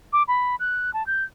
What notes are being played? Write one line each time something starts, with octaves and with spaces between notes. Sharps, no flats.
D6
B5
F#6
A5
G6